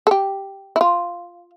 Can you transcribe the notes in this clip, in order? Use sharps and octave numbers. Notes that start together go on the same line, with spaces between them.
A4
G4
E4
F4